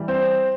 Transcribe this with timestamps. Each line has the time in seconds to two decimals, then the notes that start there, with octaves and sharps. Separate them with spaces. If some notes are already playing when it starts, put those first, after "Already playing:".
Already playing: E3 G3
0.08 C4 C5